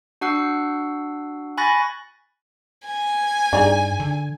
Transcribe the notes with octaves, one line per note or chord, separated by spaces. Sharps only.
D4 F#4 F#5 E6 F#6 C7
G#5 B5 C#6 F#6 A6 A#6
G#5
G2 D4 D#4 G#4
D3